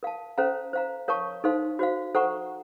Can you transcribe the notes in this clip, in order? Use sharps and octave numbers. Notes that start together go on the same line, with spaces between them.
A#4 F5 A5
C#4 A4 C5 F5 A#5
C5 F5 A#5
A#4 C#5 F5 A5 C#6
D#4 A4 C5 F5 C6
F#4 C5 F5
A4 C5 F#5 A#5 C#6